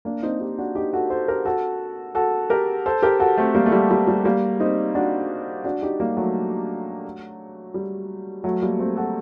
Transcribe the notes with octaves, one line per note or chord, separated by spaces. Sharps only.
A#3 D4
C4 D#4
D#4 G4
D4 F#4
D#4 G4
F#4 A4
A4 C5
G4 A#4
F#4 A4
F#4 A4
G4 A#4
A4 C5
G4 A#4
F#4 A4
A3 C4
G3 A#3
A3
G3 A#3
G3
G3
G3 A#3
C4 D#4
D4 F#4
D4 F#4
D#4 G4
G3 A#3
F#3 A3
G3
F#3 A3
G3 A#3
A3 C4
F#4 A4